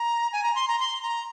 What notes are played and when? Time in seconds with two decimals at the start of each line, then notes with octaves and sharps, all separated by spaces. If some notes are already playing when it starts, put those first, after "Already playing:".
Already playing: A#5
0.33 G#5
0.43 A#5
0.55 C6
0.68 A#5
0.79 C6
1.02 A#5